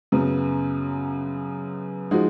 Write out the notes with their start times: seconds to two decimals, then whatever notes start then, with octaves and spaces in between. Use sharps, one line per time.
0.12 F#2 C#3 F#3 B3
2.11 F3 G#3 D#4 F#4